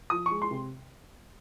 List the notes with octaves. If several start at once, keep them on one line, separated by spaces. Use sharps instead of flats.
F3 D#6
C#6
G#3
C6
C3